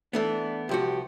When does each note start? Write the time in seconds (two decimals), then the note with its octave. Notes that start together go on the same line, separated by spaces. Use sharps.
0.13 E3 A3 B3 D4
0.69 C2 F3 F#4 G4